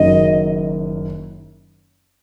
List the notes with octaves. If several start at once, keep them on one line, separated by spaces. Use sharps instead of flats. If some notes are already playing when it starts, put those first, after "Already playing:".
Already playing: F#1 F#2 D#3 F#3 D#5